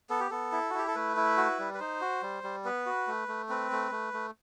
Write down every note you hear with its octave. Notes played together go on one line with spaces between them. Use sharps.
B3 A4
G4
B3 A4
E4
F#4
E4 G4
A4
A3 B4
E4
F#4
G3
B4
D#4 C5
F#4
G3
G3
B3 B4
F#4
A3
A3
C4 B4
A3
A3
A3